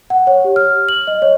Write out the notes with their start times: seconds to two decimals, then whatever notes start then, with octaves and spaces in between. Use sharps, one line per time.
0.10 F#5
0.27 C#5
0.45 G4
0.56 F6
0.89 F#7
1.07 D#5
1.22 C#5